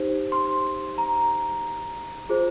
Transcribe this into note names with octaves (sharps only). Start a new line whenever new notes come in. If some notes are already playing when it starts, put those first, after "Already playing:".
Already playing: D#4 G4 C5
C6
A#5
F4 G#4 C5